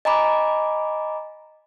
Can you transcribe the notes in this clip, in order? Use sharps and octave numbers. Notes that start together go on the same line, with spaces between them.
D#5 G#5 A#5 B5 D6